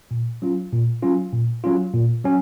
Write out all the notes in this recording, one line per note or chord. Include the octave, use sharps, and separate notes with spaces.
A#2
F#3 C#4 F4
A#2
F#3 C#4 F4
A#2
F#3 C#4 F4
A#2
F#3 C#4